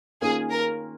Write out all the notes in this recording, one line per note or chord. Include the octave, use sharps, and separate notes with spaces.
D#3 A#3 C#4 F4 G#4
A#4